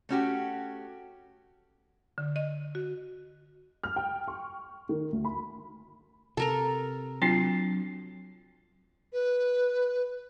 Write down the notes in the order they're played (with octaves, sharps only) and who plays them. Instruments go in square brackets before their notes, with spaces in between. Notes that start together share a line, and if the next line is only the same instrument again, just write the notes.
[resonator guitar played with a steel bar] A3 C#4 F#4 G4
[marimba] D3
D#5
F#4
[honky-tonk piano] F6
G5
C#6
D#3
D2
B5
[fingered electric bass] C3 [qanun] A4 A#4 A#5
[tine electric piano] F#3 C7 [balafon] C4 D4 F4
[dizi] B4